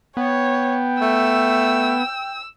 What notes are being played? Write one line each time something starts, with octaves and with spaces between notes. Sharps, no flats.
B3 C#5 G5
A3 E6